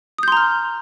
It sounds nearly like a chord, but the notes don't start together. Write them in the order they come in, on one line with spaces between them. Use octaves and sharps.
D#6 G6 C6 A#5 F6